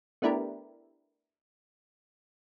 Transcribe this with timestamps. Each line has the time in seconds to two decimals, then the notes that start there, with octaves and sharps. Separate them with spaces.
0.22 A3 B3 D4 E4 G4 A#4